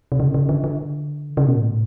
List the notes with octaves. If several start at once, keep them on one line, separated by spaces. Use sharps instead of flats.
C3
C#3
C#3
D3
D3
C#3
B2
A2